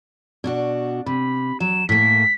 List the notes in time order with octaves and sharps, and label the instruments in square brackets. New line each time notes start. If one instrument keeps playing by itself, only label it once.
[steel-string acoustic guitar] B2 D4 F#4
[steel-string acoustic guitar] C3 [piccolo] B5
[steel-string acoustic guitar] F#3 [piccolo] E7
[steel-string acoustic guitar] A2 A#3 [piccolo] B6